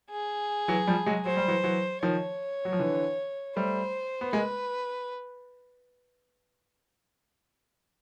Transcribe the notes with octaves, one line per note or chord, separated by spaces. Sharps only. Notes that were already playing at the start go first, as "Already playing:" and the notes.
G#4
E3 F#3
F3 G3
F#3 G#3
F#3 C5
G3
E3 F#3
E3 F#3
D#3 F3 C#5
F#3
F3
D3 E3
G3 A3 C5
B3
G#3 A#3 B4